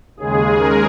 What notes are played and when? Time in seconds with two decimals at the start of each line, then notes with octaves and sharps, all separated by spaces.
0.16 D#2 C#3 G#3 G#4
0.58 A#4